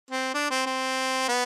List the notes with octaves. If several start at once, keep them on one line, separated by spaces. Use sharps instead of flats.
C4
D4
C4
C4
B3